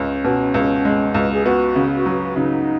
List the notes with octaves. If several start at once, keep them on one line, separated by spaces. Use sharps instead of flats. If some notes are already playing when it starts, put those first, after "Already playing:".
Already playing: C#2 G#3 C#4
B2
C#2
G#3
C#2
G#4
B3 F#4
C#3
F#4
F#3
C#3 D#4